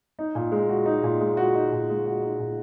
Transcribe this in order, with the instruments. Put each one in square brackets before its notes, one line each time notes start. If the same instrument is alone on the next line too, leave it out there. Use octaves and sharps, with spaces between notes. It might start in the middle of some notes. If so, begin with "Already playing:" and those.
[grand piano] D#4
A#2
G#3
F#4
D#4
A#2
G#3
F#4
D#4
A#2
G#3
F#4
D#4
A#2